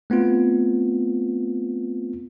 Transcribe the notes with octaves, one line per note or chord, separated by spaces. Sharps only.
A3 B3 C4 F4